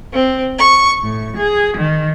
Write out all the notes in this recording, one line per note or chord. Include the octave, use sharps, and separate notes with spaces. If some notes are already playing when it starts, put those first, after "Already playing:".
C4
C#6
A2
G#4
D#3